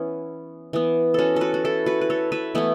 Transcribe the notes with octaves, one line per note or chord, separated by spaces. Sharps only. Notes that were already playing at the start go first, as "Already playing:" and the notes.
Already playing: E3 B3 C#4 E4
E3 B3
C#4 F#4 A4
F#4 A4 B4
F#4
E4 A4
F#4 B4
B4
A4 C#5
B4 E5
E3 A3 B3 E4